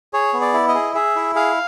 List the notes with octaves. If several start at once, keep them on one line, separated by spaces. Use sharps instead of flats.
G#4 C#5
B3
D5
E4
D#5
G#4
G#4 E5
E4
G#4 F5